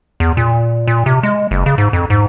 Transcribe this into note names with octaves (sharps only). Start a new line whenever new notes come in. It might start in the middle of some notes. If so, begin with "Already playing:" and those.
E2
A#2
A#2
C3
G#3
F#1
C#3
G#2
F2
G#2